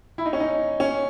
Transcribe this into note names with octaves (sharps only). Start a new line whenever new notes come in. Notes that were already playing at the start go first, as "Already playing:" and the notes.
E4
D#4
C#4
D#4
C#4